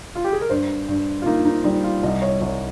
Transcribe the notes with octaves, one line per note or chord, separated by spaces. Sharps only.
F4
G4
G#4
A#4
G2 C5
G2
F4
A#3 D#4
D#4
G3 D#4
F4
C2 D#5
C#5
C2 C#5